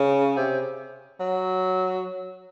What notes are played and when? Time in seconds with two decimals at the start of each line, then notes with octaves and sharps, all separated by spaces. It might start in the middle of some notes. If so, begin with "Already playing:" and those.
Already playing: C#3
0.36 C3
1.20 F#3